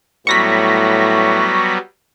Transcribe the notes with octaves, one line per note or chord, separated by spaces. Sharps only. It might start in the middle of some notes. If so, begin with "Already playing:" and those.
A2 F#3 G3 B3 C#6 A#6 B6